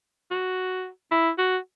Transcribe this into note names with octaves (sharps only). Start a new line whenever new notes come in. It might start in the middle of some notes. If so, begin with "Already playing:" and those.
F#4
E4
F#4